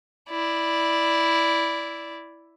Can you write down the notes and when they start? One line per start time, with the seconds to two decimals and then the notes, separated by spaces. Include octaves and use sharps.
0.30 E4 D5